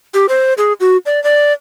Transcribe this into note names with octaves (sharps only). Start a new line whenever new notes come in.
G4
C5
G#4
F#4
D5
D5